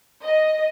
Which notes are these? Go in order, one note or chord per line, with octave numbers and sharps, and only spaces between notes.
D#5